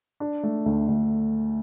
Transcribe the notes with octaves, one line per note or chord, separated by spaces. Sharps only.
D4
A3
D2
D2